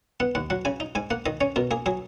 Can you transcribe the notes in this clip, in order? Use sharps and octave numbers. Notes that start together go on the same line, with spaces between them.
B3 F#5
D#2 F#5
F#3 F#5
C#3 G#5
D#4
G#2 G#5
A#3 F#5
D#3 D#5
C#4 C#5
B2 A#4
A#3 G#4
F#3 G#4